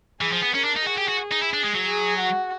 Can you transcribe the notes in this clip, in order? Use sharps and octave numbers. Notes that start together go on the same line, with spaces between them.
E3 G#4
F3
B3
C#4 A#4
D4
D#4
F#4 G#4
G4
F#4
D#4
E4
D4
G#3
F#3
G#4
F#4